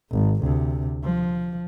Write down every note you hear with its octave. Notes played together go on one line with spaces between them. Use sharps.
G#1
D2 C3
F3